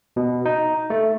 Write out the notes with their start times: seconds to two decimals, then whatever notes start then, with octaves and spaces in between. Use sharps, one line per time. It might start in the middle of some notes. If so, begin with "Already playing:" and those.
0.16 B2
0.46 D#4
0.90 A3